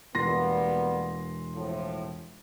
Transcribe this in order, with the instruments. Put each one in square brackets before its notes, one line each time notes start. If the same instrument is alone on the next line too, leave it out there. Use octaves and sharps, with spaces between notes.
[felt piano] E1 C6 A#6 [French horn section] G3 A#3 B3
[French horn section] A2 F3